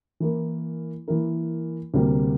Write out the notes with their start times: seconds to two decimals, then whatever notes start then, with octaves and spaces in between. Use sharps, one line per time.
0.20 E3 A#3 E4 A#4
1.08 E3 A#3 E4 A#4
1.94 D2 C3 G3 A#3